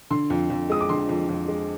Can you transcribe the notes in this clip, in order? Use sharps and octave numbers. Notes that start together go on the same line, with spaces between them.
D3 C6
F2
F2
G#3 D#6
D6
D3 C6
F2
F2
G#3